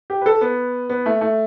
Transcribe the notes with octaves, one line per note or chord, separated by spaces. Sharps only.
G4
B4
A4
B3
B3
A3
A3